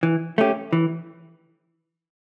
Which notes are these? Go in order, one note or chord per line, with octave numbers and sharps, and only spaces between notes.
E3
A3 C#4 G4
E3